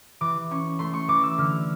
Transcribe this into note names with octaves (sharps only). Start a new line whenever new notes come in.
E3 D6
C#4 C#6
A3 C6
C#6
E3 D6
E6
D3 F6